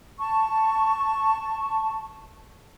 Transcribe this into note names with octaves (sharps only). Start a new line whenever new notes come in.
A5 C#6